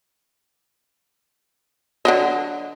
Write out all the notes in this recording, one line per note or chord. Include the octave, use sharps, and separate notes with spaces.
D3 F#3 D#5